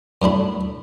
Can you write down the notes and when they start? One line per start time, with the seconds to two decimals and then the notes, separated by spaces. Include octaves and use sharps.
0.22 F#2 A2 D4 B5